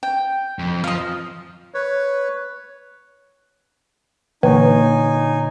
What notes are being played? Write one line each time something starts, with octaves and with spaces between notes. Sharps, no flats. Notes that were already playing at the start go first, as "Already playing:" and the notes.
G5
F2
F3 D#5 F5
B4 C#5
A#2 D3 E3 A#3 D#4 C#5 G#5